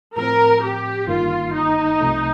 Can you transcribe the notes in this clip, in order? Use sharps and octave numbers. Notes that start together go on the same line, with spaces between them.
A2 F3 C4 A#4
G4
G1 G2 D#3 A#3 F4
D#4
C2 C3 F3 A3